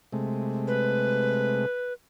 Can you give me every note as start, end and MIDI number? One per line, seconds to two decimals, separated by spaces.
0.12 1.66 48
0.12 1.66 56
0.12 1.66 57
0.68 1.93 71